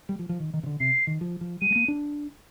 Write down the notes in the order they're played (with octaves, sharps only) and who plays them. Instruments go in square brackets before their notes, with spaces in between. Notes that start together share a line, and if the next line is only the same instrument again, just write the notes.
[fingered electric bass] G3
F3
F3
D#3
D#3
C3
D3
[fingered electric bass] C3 [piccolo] C7
[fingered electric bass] D#3
F3
F3
[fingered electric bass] G3 [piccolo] D#7
[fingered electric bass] G#3
A#3
D4